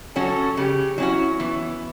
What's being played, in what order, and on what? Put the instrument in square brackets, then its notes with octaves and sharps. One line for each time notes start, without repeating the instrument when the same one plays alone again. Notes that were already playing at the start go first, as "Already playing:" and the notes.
[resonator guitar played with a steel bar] F#3 C#4 F#4 [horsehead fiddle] A4
[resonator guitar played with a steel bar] C#3 [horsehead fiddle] G4
[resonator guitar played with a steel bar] F#3 C#4 F#4 [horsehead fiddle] E4
[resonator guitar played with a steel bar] E3 [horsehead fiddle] B3